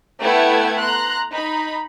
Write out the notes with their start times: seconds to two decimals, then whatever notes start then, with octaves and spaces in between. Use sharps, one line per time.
0.21 A3 B3 E4 F#5 G5 G#6
0.81 A#5 C6 F#6
1.32 D#4 B5